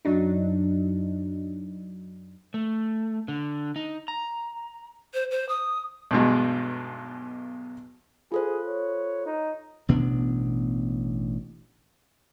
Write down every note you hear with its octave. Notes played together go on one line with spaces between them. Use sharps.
F#2 F#3 D4 D#4
A3
D3
D#4
A#5
C5
C5
D#6
B1 E2 G2 B2 G#3
F4 G#4 A4 C5
C#5
D#4
A1 B2 B3 D4